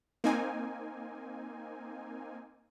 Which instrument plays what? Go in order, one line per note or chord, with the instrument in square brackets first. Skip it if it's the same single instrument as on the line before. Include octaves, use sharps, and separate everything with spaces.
[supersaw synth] A#3 C4 D#4 G#5